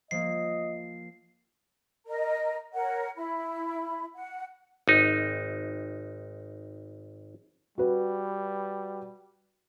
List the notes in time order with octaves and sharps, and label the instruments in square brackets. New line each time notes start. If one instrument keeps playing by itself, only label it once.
[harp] F3 A#3 [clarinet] D#5 [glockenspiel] C7
[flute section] A#4 D#5 A#5
A#4 C#5 F#5
E4 B5
F#5
[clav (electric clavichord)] G#1 D#4
[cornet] G3 [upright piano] F#4 B4